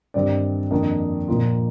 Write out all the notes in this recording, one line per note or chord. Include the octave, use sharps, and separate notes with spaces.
G2 D#3 G3 C4 D5
F2 D#3 A#3 D4 D#5
A#2 F3 A#3 F4